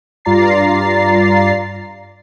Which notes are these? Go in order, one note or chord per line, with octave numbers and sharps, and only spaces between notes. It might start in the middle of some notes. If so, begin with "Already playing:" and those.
G2 F4 D5 A#5 A6 C7